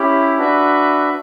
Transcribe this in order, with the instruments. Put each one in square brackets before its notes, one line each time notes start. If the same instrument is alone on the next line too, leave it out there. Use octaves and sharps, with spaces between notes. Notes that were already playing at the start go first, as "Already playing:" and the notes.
Already playing: [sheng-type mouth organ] C#4 E4 G4
D4 F#4 B4 E5